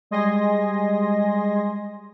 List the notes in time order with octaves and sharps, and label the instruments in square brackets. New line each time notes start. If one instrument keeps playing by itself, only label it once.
[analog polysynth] G3 G#3 D#5 G#5 C6 A#6